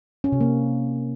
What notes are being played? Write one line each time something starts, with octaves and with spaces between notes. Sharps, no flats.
C#4
C3
A#3